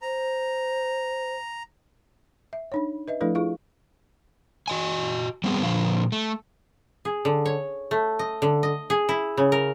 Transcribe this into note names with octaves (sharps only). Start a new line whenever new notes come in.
C5 A#5
E5
D4 D#4 C#5
B4 D#5 E5
F3 A3 D4 E4 A4 B4
E4 F4 G#4 F5
F#4 D#5 G#5
G3 B3 C4 G#4
A#2 D3 F3 F5
A3
G#4
D3
C#5
A3
D#5
D3
D#5
G#4
E4
C#3
A#4